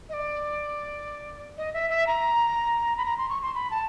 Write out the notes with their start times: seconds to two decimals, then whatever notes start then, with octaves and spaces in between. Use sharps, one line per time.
0.09 D#5
0.13 D5
1.58 D#5
1.74 E5
1.90 E5
2.07 A#5
2.98 B5
3.05 A#5
3.18 C6
3.30 C#6
3.42 C6
3.55 B5
3.71 A5